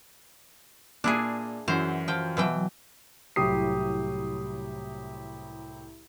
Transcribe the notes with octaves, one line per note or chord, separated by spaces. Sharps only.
A#2 D4 E4 G#4
F#2 E3 E4 F#4 C5
F3 G5
B2 E3 F#3 G5
C2 A2 F#3 G4 D#6 C7